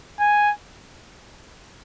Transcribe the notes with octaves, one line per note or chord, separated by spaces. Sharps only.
G#5